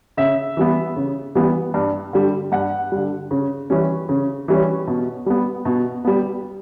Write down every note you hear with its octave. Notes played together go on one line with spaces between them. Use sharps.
C#3 E5
E3 G3 B3
C#3
E3 G3 B3
G2
D3 G3
G2 F#5
D3 G3
C#3
E3 G3 C#4
C#3
E3 G3 C#4
B2
G3 B3
B2
G3 B3